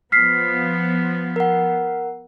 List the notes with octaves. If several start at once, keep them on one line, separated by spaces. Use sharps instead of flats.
F3 B3 F6 B6 C7
A#4 F#5